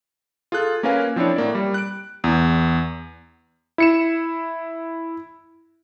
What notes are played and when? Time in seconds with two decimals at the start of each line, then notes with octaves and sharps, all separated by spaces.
0.52 F4 G#4 A4 F#6
0.83 A#3 C#4 A#4 B4 F5 G#5
1.16 F3 C4 D4 E4 C#5
1.36 A2 A#3 D5
1.55 G3
1.74 F#6 D7
2.24 E2
3.78 E4 C#7 E7